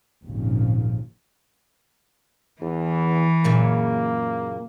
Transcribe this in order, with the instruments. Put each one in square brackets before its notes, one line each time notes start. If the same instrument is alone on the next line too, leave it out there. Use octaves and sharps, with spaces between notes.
[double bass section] G#1 D#2 A#2 C#3 F3
[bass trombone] E2 [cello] E3
[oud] F#2 A#2 C#3 [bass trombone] A#3